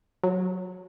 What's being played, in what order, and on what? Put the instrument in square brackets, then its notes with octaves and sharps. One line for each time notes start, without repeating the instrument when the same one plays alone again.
[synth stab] F#3